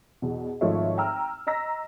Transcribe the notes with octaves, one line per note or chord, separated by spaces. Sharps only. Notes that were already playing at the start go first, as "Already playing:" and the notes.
E2 B2
G#1 F3 A3 D#4 C#5 E5
G5 A#5 E6 F6
D#5 A#5 E6 A#6 B6